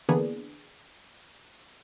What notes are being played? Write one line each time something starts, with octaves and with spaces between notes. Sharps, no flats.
D3 E3 A#3 B3 D4 G#4